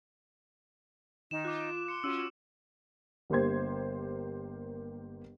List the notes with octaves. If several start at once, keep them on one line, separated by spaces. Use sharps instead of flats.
D#3 D#4 E7
F4 D6 F#6
D7
C6 C#7
C#4 F4 F#4 E6 D#7
G1 A#3 G4 C5 G#6